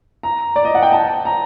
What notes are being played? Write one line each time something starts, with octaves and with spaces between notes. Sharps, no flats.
A#5
D5
D#5
F#5
G5
A5
A#5